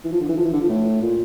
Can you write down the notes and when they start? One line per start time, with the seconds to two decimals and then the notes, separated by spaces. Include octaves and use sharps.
0.04 E3
0.12 F3
0.21 D3
0.29 E3
0.37 F3
0.45 E3
0.53 D3
0.61 F3
0.69 A2
1.02 A#2